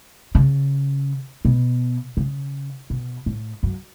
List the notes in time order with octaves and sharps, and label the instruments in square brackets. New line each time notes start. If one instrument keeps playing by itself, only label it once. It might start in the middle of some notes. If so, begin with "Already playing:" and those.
[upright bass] C#3
B2
C#3
B2
A2
F#2